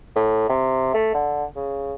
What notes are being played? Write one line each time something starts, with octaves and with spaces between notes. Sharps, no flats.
A2
C3
A3
D3
C#3